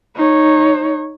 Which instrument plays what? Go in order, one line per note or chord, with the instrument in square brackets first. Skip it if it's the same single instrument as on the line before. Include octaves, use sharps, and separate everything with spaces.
[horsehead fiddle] D#4 C#5